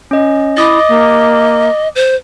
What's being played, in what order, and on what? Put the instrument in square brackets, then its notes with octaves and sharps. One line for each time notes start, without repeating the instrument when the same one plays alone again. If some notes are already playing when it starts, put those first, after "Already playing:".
[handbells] C#4 D#5
[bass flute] E4 [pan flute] D#5 [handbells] D6 D#6 A6
[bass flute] A#3
[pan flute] C5